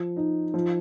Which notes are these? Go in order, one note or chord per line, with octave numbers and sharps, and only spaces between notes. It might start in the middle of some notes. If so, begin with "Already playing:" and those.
Already playing: F3
D#4
F3